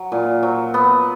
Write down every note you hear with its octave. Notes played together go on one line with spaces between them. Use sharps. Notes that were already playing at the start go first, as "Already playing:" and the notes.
Already playing: F#3
A#2
F#3
B3